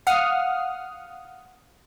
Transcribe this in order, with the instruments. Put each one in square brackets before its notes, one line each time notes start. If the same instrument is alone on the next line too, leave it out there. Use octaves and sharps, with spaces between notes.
[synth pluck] F5 F#5 D#6 F6